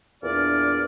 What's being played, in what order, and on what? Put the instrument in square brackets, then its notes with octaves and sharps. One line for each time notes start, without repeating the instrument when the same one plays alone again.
[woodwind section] E2 A#2 D4 D5 F6